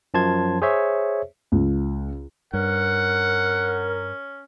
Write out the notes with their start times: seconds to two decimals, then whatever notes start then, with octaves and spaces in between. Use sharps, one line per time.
0.14 F#2 F3 A5 C6 G#6
0.62 G#4 C5 C#5 E5
1.52 C#2
2.53 G2 C#4 A#4 F#5